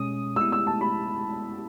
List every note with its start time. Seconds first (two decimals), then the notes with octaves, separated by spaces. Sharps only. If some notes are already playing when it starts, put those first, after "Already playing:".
Already playing: B2 G#3 C#4 D#6
0.36 G#3 B3 E4 E6
0.52 E6
0.67 A5
0.81 B5